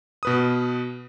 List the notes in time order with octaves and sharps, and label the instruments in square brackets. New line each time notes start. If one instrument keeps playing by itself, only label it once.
[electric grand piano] B2 B4 D#6